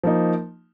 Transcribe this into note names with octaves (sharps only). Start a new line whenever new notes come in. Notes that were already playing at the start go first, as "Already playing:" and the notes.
F3 A#3 D#4